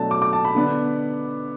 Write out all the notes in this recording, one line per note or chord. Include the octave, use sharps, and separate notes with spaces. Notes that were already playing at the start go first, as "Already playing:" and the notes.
Already playing: B2 F#3 A3 D4 A5
D6
D6
A5
B5
D3 B3 D4